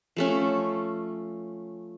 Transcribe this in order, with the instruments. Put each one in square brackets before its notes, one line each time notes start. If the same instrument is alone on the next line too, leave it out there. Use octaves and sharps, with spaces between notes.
[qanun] F3 A3 C#4